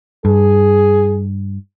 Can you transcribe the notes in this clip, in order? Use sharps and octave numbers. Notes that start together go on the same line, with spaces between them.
G2 G#4